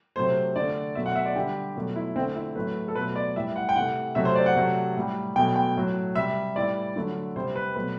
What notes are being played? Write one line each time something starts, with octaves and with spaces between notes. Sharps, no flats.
C3 F#3 A3 C5
D3 A3 D5
B2 F#3 A3 E5
F#5
E5
D5
D3 G3 G4
B2 F#3 A3
E4
D3 A3 C4
E4
A2 F#3 A3 B4
A4
B2 F#3 A3 B4
D5
A2 E3 G3 E5
F#5
G5
C3 E3 A3 F#5
C3 F#3 A3 E5
C5
D5
F#5
C3 F#3 A3
A2 G3
B2 F#3 A3 G5
G5
A2 F#3 A3
C3 G3 E5
A2 E3 G3 D5
D3 F#3 A3
C3 G3 C5
B4
B2 F#3 A3 B4